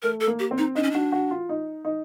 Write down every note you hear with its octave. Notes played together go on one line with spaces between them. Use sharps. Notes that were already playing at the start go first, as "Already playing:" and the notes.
A3 A#4
A4
A#3
G4
C4
D#4
D4 D#4
C#4
D4 F#4
F#4
F4
D#4
D#4